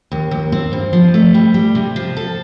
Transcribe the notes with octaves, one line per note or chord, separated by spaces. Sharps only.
D#2
D#2
C4
G2
F3
A3
G3
G3
C3
F3
A4